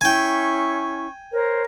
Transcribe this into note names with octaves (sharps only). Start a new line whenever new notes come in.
C#4 E4 G5 G#5 C#6
A#4 C5 C#5